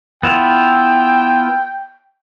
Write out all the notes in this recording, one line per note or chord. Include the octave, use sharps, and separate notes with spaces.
B3 E4 F4 G5